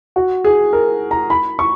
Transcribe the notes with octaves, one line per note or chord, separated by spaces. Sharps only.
F#4
G#4
A#4
A#5
B5
C#6